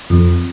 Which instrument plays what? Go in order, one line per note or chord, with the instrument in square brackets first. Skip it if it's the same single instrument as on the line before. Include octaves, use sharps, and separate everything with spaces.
[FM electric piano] F2